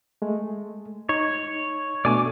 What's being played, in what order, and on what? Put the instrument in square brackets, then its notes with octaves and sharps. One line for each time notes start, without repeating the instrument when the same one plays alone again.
[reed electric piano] G#3 A3
[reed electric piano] D#4 [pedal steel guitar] C#5
[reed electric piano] B2 A3 D4 [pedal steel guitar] D5 G#5 D6